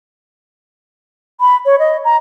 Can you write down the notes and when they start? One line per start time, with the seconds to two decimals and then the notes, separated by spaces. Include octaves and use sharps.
1.41 B5
1.66 C#5
1.79 D#5
2.05 A#5